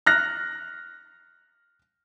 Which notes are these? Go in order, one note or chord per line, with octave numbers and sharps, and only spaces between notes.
F6 F#6 A#6